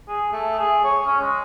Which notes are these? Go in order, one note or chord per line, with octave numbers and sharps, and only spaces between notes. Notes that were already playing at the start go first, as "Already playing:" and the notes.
G#4
A3
G#4
C#5
C#4
G#3